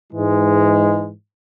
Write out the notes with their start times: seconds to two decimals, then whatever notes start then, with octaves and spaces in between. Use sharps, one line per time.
0.13 G#2 E3 G#3